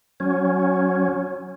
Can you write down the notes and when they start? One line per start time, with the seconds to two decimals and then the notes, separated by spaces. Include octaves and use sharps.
0.20 F#3 C#4